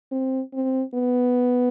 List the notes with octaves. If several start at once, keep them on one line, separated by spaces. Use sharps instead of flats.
C4
C4
B3